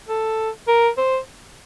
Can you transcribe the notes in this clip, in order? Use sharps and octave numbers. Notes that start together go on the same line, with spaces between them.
A4
A#4
C5